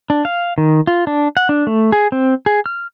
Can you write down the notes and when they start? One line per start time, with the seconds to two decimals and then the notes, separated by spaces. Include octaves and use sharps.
0.10 D4
0.25 F5
0.58 D#3
0.87 F4
1.07 D4
1.37 F#5
1.49 D4
1.67 A3
1.92 G#4
2.12 C4
2.46 G#4
2.66 F6